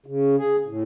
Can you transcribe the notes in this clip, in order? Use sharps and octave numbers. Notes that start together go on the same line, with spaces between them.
C#3
G#4
A2